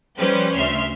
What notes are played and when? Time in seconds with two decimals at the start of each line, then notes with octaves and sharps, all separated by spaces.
0.17 F3 G3 C#4 G4 B4 C5
0.53 D2 C#3 E5 C6 F6